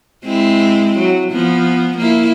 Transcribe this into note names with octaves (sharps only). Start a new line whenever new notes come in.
G#3 C4 E4
F#3
F3 B3
A#3 E4